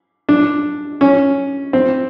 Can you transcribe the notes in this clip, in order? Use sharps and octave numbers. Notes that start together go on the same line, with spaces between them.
D4
C#4
C4